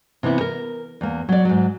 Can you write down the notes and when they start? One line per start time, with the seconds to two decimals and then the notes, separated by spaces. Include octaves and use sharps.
0.23 C3 E3 A#3 B3 E4
0.41 A#4
1.01 E2 A#3
1.29 F#3 D5
1.45 G#2 F#3